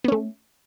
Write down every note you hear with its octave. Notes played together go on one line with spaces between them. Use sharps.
A3 B3 C#4